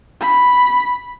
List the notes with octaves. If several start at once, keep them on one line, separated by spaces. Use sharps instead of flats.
B5